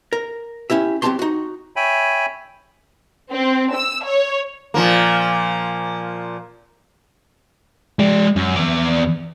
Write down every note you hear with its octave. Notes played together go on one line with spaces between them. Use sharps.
A#4
C#4 E4 G4 E5
F#3 C4 C#4 G4 A5 C6
D#4 F#4
C#5 E5 G5 G#5 B5
C4
E6
C#5
A#2 F3 A#3
G#3 D5
F#2
E2 D5